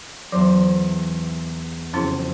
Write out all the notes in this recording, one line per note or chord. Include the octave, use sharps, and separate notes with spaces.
E2 F#3 C5
F#1 F2 F3 C#4 E4